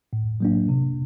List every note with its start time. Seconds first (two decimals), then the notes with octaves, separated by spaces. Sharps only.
0.13 A2
0.40 F#3 A#3 D4
0.69 C3